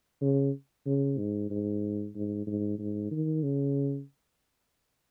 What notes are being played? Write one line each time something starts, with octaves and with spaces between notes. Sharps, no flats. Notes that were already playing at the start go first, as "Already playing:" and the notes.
C#3
C#3
G#2
G#2
G#2
G#2
G#2
D#3
C#3